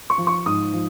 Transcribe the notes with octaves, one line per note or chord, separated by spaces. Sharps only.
C#6
F3
C#6
G#2 D#6
F3